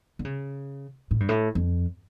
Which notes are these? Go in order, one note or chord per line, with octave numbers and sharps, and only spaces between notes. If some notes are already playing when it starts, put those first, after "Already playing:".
D3
C#3
A2
G2
A2
F2